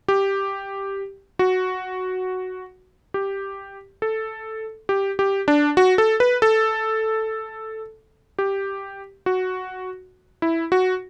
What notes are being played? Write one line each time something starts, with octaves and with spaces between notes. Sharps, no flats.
G4
F#4
G4
A4
G4
G4
D4
F#4
A4
B4
A4
G4
F#4
E4
F#4